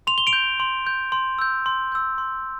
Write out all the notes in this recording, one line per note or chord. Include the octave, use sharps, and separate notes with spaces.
C6 F7
G7
D7 F7
G6
C6
G6
C6
E6 G6
C6
E6 G6
C6